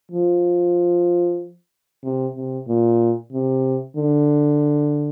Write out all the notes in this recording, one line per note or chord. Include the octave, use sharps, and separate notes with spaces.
F3
C3
C3
A#2
C3
D3